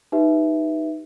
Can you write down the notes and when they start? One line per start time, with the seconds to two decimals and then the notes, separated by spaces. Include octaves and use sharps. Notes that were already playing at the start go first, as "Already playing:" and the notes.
0.12 D#4 G4 B4 E5